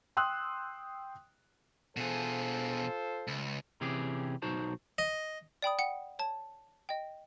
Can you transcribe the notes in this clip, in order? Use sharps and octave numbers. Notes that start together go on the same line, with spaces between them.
G5 C6 D#6 E6 F#6
B2 F4 G#4 A4 C5
C#2
C3 E3 C#4 G4 G#4
B1 D#4 F#4 C5 A5
D#5
D5 G5 B5 D#6
F#5 G5 C#7
C#5 A5
D#5 G5